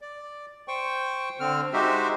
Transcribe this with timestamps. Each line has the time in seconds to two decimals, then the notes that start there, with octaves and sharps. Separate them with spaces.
0.01 D5
0.68 C5 G5 C#6
1.40 D3 C4 F6
1.73 G#3 D#4 F#4 G4 C5 E5